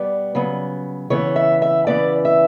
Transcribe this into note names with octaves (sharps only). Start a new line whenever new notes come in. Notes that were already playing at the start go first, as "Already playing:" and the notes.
Already playing: B2 G3 B3 D5
C#3 F#3 B3
C#3 E3 B3 C#5
E5
E5
E2 C#3 E3 B3 D5
E5